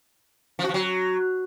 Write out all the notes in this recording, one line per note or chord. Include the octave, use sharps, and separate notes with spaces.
F3
F#4
F3
F#3